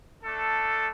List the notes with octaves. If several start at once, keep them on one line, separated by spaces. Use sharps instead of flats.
A3 D4 A4